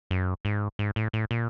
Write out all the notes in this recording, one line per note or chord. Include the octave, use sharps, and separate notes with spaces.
F#2
G#2
G#2
A2
A2
A#2